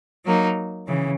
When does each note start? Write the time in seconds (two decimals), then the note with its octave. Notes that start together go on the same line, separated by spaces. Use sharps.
0.24 F#3 A#3 D#4
0.87 C#3 E3